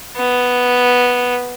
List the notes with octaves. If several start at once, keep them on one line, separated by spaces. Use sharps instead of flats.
B3